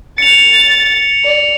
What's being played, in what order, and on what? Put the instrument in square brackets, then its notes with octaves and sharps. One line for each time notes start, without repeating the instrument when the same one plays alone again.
[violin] A6 [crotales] C#7 F7
[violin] D5